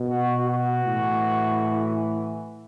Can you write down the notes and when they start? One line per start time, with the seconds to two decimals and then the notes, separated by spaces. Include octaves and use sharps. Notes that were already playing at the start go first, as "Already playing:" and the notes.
Already playing: B2
0.08 F#4
0.47 F#4
0.85 A2 E3